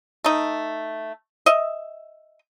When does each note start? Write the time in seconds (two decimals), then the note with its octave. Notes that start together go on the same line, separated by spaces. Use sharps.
0.24 A3 D#4
1.46 D#5 E5